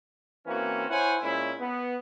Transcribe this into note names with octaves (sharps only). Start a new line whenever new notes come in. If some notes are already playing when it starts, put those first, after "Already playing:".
E3 A#3 C4 C#4 F#4
E4 C5 C#5 F#5 G#5
A#2 G#3 C#4 E4
B3